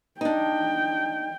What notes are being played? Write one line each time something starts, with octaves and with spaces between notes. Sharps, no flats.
D4 D#4 G5